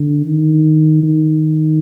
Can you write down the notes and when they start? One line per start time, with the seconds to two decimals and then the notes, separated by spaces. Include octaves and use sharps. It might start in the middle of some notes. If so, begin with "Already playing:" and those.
Already playing: D3
0.25 D#3
1.03 D#3